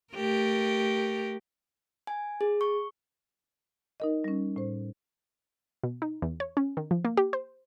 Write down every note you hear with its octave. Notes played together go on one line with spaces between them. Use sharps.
A3 G4 A#4
G#5
G#4
C#6
D#4 A#4 D#5
G3 C#4
A2 C5
B2
D#4
E2
C#5
C#4
D#3
F3
A#3
G4
C5